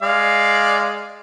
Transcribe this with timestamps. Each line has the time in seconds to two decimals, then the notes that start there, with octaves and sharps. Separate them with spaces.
0.02 G#3 D5 F5